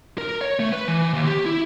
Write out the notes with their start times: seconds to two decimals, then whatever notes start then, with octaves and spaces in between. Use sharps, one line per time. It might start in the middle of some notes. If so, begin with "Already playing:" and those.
0.18 A#4
0.41 C#5
0.59 A3
0.72 B4
0.88 E3
1.13 D#2
1.27 G4
1.46 E4